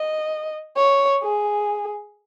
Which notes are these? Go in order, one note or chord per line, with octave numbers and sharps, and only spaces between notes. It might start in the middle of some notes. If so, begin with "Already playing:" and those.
Already playing: D#5
C#5
G#4